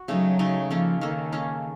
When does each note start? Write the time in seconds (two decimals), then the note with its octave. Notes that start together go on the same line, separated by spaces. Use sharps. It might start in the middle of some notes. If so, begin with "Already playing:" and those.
Already playing: F#4
0.08 C#3 F#3 A3 D#4
0.39 C#3 A3 D#4
0.70 F3 A#3 C#4 A4
1.01 D#3 A#3 C#4 A4
1.32 A#3 C#4 A4